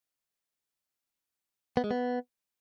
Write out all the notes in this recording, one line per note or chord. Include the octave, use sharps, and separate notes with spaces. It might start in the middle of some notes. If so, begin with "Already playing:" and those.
B3
G#3
B3